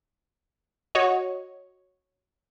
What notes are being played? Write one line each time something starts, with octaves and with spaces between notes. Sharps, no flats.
F#4 C#5 D#5